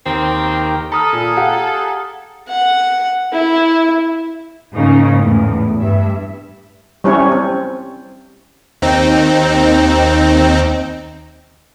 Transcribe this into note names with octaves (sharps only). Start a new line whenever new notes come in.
D#2 C4 G4 A#4
A4 A#5 B5 D#6 F6
A#2 G#4
G4 F5 F#5
F#5
E4
G#2 C#3 A#3 D#4
E2 A2
G2 E5
G3 C4 C#4 E4 C#5
C4
D#2 C4 D#4